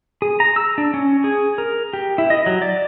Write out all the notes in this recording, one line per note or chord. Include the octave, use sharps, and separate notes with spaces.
G#4
A#5
E6
D4
C#4
G#4
A#4
G4
E4
D#5
F#3
D5